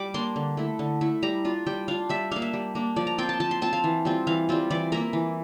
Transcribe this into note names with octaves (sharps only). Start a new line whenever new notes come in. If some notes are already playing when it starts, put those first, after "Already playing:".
Already playing: G3 D6
A#3 D4 C6
D3
A3 E4
D3
A3 E4
G3 A#5
D4 F4
G3 G5
D4 F4 F5
G3 E5
A#3 D4 F5
E5
G3
A#3 D4
F3 D5
A#5
C4 F4 G5
A5
F3 A5
C6
C4 F4 A5
F5
E3
G3 C4 F4
E3 F5
G3 C4 F4
E3 D5
A#3 E4 A#4
E3